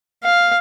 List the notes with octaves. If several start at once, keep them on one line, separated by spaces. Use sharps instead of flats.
F5